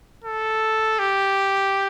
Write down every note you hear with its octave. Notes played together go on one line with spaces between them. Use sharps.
A4
G4